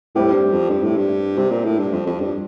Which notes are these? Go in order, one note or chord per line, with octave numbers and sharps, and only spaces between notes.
A2 G3 C4 G4
G2
F2
G2
A2
G2
C3
A#2
A2
G2
F2
F2
G2